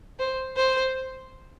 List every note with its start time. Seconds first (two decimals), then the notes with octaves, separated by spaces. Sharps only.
0.19 C5
0.57 C5